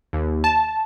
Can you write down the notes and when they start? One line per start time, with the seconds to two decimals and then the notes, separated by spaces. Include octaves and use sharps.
0.13 D#2
0.44 A5